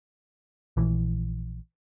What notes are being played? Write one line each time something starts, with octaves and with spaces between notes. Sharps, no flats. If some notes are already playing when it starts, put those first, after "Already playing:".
A#1 E3